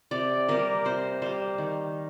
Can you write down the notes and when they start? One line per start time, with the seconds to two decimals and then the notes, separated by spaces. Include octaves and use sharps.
0.11 C3 D5
0.48 G3 A#3 A#4
0.85 C3 C5
1.22 G3 A#3 C5
1.58 D#3